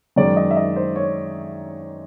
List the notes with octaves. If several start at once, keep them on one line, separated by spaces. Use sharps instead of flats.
F#2 D#3 G#3 D5
D#5
E5
D#5
C5
C#5